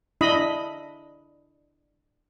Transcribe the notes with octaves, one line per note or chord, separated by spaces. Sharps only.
D4 E4 D#5 B5